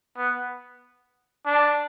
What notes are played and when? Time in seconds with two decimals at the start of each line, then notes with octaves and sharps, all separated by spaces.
0.17 B3
1.46 D4